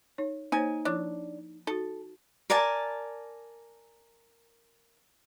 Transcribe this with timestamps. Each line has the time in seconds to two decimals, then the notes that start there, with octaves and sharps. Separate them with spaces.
0.18 D#4 C#5
0.52 A#3 D#4 C5 C#5 G#5
0.85 F3 D4 E4 C#5
1.67 D#4 F#4 A4
2.50 A#4 D5 G#5 A5